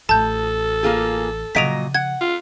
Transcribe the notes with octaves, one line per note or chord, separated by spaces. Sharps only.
A1 A3 A4 A5 G6
A#3 F4 G#4
A#2 C#3 F3 F#3 D#5 B6 D7 F7
F#5 G#6
F4